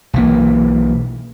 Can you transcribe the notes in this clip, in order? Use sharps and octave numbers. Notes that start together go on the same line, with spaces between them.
B1 E3 A#3